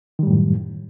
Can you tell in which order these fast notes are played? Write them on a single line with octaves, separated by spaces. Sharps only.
D#3 G3 A2 F#2